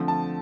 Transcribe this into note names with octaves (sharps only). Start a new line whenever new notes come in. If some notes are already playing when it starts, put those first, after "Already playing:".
Already playing: D3 F3 A3 C4
A5